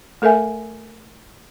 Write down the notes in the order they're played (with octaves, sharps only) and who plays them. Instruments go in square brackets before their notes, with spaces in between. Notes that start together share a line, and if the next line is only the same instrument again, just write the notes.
[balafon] A3 A4 A#4 E5 G#5